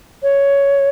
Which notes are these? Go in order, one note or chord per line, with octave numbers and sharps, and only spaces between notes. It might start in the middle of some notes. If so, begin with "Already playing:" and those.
C#5